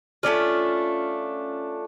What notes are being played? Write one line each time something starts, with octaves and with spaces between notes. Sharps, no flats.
A3 C#4 D4 F4